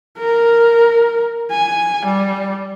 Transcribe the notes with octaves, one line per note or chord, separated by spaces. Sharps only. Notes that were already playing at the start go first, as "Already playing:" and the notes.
A#4
G#5
G3